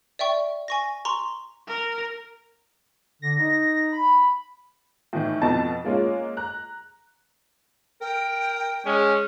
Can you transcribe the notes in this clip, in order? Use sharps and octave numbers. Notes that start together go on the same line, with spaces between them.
D5 E5 G5 C#6
G#5 C#6 A#6
A#5 C6 C#6
A#4
D3 A#6
D#4
B5
A2 D#3 E3
F2 B2 A5 A6
G#3 A#3 C#4 F4
A#5 F#6
A#4 G5
G#3 C#4